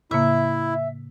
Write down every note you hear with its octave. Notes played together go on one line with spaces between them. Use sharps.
A2 C#3 A#3 E4 E5